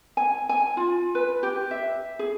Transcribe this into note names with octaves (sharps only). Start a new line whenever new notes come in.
G#5
G#5
F4
B4
G4
E5
G#4